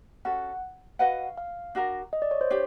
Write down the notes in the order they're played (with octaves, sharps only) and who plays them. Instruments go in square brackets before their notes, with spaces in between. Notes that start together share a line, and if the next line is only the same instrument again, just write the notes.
[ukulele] C#4 F#4 A4 [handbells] F#5
[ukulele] F#4 B4 D#5 F#5 [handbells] F5
[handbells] F5
[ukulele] D4 F#4 A#4
[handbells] D#5
D5
C#5
C5
[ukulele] D4 G4 [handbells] C#5